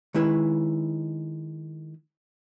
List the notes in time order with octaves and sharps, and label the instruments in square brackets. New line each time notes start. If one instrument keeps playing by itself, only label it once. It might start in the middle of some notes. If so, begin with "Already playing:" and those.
[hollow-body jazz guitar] D#3 G#3 E4 B4 C#5